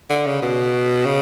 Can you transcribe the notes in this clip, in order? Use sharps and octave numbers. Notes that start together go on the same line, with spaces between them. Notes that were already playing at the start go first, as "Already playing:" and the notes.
D3
C#3
B2
C#3